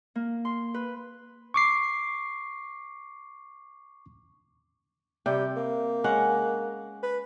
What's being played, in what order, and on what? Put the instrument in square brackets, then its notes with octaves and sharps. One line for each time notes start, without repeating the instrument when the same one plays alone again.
[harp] A#3
C6
B4
[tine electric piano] C#6 D6 C7
[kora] C3 G5 [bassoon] G3
[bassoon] A#3
[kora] G#3 C#4 F#5
[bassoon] B4